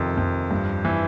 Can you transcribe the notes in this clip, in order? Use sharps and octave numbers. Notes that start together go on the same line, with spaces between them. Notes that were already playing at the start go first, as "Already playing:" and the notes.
Already playing: F2 C3 D#3
F2
G2
E3